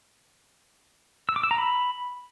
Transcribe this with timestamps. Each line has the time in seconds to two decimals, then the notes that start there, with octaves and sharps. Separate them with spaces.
1.29 E6
1.36 D6
1.43 E6
1.51 A#5
1.58 B5